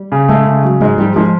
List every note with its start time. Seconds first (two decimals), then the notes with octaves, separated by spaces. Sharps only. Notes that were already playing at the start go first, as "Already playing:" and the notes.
Already playing: G3
0.12 C#3
0.29 G#3 A3
0.46 C#3
0.63 F#3
0.81 G#2 G#3
0.98 F3 G3
1.16 F3 G#3